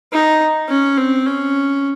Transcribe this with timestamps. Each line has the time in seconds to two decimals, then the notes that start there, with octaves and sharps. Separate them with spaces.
0.13 D#4
0.69 C#4
0.97 C4
1.26 C#4